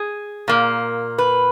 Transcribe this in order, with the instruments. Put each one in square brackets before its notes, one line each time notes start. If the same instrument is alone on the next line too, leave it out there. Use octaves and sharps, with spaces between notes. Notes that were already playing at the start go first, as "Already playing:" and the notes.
Already playing: [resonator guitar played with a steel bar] G#4
A#2 A#3
B4